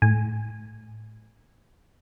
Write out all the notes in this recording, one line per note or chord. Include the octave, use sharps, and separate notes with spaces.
A2 G#5